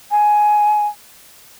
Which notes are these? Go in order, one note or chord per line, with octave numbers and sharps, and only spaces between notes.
G#5